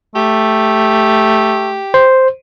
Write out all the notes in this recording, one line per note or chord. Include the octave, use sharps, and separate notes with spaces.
A3 G4
C5